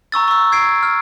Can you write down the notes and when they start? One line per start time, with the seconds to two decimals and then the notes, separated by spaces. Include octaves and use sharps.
0.12 A#5 C#6 E6 A6
0.28 C#6 E6
0.52 G#6 C7 D7
0.83 F6